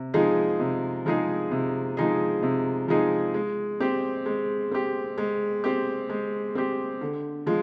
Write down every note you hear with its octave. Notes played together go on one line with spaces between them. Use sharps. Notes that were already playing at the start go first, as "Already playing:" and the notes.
Already playing: C3
F3 G#3 D#4 G#4
C3
F3 G#3 D#4 G#4
C3
F3 G#3 D#4 G#4
C3
F3 G#3 D#4 G#4
G#3
C4 G4
G#3
C4 G4
G#3
C4 G4
G#3
C4 G4
D3
F3 G#3